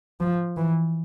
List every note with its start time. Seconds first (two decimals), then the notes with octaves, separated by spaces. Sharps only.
0.21 F3
0.57 E3